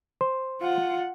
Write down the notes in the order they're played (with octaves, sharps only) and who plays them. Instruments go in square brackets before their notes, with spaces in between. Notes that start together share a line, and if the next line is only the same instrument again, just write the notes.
[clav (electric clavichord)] C5
[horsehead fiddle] F4 F#5